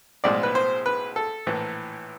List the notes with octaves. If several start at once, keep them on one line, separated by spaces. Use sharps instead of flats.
B1 A2 F3 G#3 D5
B4
C5
B4
A4
A#1 A2 E3